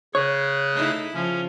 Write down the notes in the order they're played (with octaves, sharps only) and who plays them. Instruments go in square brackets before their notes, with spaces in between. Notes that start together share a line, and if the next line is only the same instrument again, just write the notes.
[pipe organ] C#3 G#4 F#6 [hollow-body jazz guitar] C#5
[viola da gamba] A3 D#4 E4
[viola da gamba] C#3 F3 [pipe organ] C#4